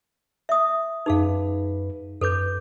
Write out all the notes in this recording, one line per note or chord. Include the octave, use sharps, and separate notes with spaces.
E5 D#6
F#2 D#4 G#4 B4 F5
F#2 A4 B4 D6 G6